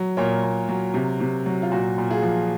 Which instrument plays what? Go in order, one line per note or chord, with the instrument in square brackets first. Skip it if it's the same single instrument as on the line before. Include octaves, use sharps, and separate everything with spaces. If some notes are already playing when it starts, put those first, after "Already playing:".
Already playing: [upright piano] F#3
A#2 A#4 C#5
A#2
F#3
C3
C3
F#3
F4
A#2 F#4
A#2
F4 G#4
F3